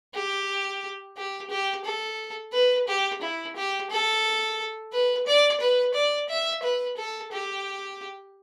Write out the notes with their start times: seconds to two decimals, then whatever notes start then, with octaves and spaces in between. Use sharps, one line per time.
0.15 G4
1.17 G4
1.50 G4
1.85 A4
2.53 B4
2.88 G4
3.22 E4
3.56 G4
3.90 A4
4.92 B4
5.27 D5
5.60 B4
5.94 D5
6.29 E5
6.63 B4
6.97 A4
7.32 G4